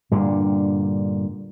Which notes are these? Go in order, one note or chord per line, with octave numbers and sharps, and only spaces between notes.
G2 A#2 D3